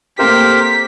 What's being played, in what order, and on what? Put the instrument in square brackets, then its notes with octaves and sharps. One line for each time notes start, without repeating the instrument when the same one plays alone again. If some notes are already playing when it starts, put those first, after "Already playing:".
[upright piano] A3 A#3 C4 [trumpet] G4 [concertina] A#4 C5 [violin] B6